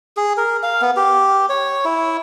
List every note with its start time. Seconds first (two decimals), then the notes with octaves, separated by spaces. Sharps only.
0.17 G#4
0.37 A#4
0.63 F5
0.82 B3
0.97 G4
1.49 C#5
1.85 E4